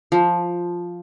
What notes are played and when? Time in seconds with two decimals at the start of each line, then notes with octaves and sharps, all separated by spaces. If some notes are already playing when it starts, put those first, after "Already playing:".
0.12 F3